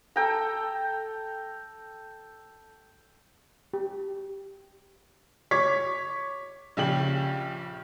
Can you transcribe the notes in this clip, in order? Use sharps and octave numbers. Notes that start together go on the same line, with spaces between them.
A4 G5 A#5
G4
C#5 C#6 D6 G#6 B6
A#1 C#3 G4 F#7